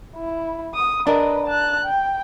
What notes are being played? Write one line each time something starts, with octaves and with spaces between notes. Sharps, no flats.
E4
D#6
D4 A#4 B4 D#5
A5 F#6
G5